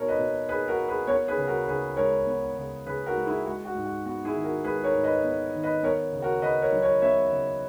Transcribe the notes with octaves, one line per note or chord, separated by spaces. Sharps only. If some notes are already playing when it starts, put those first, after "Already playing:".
Already playing: B2 A#3 A#4 C#5
B4 D#5
B2
A#3 G#4 B4
F#4 A#4
A#3
G#4 B4
B3 A#4 C#5
G#4 B4
C#3
F#4 A#4
C#3 G#4 B4
G#3 A#4 C#5
B3
C#3
C#3 G#4 B4
F#4 A#4
G#3
E4 G#4
G#3 F#4
F#4
G#2
F#4
B3 F#4
E4 G#4
D#3
F#4 A#4
G#3 G#4 B4
A#4 C#5
G#2
B4 D#5
B3
D#3
B4 D#5
B3 A#4 C#5
C#3
F#4 A#4
C#3 B4 D#5
A#4 C#5
F#3
A#4 C#5
B3 C#5 E5
C#3